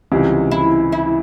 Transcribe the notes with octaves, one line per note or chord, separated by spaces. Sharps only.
C#2 C3 E3 G3
E4
E4